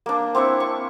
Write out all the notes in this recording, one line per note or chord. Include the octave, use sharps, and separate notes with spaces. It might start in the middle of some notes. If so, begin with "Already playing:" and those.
A#3 D4
C4 D4 E4 C#6
C#6